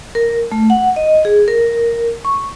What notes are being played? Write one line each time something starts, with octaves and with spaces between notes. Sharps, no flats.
A#4
A3
F#5
D#5
G#4
A#4
C#6